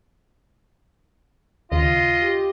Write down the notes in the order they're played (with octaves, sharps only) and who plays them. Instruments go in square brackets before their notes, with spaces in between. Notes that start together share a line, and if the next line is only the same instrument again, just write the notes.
[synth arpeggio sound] D#2 C#3 [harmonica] F4 [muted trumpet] D#5
[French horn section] G4